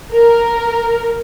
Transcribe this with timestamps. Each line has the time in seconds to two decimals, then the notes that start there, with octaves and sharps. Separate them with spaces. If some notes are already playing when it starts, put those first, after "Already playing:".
0.13 A#4